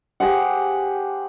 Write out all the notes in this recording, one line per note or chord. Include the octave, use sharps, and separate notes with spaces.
G4 G#4 C5 F#5